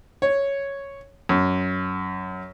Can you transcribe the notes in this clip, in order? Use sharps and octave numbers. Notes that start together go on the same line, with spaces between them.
C#5
F#2